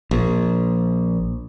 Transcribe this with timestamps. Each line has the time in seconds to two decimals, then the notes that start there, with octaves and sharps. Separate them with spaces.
0.11 A#1